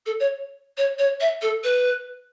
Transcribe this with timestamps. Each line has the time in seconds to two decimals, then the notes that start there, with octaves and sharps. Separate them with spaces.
0.06 A4
0.20 C#5
0.77 C#5
0.98 C#5
1.20 E5
1.42 A4
1.64 B4